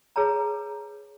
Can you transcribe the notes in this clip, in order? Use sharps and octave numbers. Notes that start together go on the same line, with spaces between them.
G#4 B4 C#5 A5 A#5